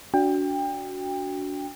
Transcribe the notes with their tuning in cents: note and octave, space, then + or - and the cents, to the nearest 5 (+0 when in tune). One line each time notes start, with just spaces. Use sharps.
D4 -25 F#4 +0 G5 +25